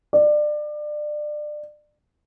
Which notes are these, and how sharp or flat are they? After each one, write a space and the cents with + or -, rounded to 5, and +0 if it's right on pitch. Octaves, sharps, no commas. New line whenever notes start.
D5 +25